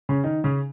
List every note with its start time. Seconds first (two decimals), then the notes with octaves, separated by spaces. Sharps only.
0.09 C#3 C#4
0.24 D#3 D#4
0.44 C#3 C#4